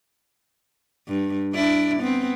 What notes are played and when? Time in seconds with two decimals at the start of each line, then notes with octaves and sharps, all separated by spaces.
1.08 G2
1.54 D4 E4 D5
2.00 B3 C4